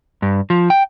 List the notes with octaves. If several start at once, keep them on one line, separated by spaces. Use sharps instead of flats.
G2
F3
G5